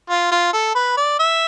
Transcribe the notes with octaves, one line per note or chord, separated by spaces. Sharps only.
F4
F4
A4
B4
D5
E5